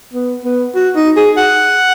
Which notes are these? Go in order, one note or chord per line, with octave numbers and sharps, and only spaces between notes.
B3
B3
F#4
D#4
G#4
F#5